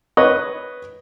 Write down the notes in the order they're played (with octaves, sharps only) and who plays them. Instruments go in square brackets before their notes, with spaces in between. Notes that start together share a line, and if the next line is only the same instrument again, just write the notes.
[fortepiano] B4 C#5 D#5